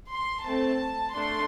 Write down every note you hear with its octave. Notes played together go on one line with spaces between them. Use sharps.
C6
A3 C4 A4 A5
A3 D4 A4 C6